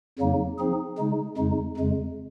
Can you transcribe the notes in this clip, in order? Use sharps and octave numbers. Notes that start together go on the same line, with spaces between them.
F2 C#3 F#3 A#3 D#4
F3 C4 D#4 G#4
C#3 G#3 D#4
F2 C#3 G#3 D#4
F2 C#3 G#3